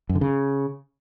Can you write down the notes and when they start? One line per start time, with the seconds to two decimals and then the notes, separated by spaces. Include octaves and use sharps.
0.09 F#2
0.15 D3
0.21 C#3